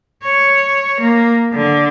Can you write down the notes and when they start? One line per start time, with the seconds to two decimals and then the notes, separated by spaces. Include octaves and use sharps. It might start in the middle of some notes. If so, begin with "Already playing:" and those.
0.23 C#5
1.00 A#3
1.53 D3